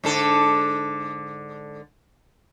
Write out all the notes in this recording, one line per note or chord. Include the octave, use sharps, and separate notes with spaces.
G#2 D3 A4